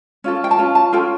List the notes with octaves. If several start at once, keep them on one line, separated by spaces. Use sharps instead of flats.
C#4 F4 A4
G5
A5
C#4 F4
A5
C#4 F4 A4 G5